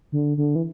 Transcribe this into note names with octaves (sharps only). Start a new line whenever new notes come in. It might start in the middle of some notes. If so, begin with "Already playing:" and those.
D3
D3
E3